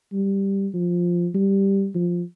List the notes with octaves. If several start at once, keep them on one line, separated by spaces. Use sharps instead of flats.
G3
F3
G3
F3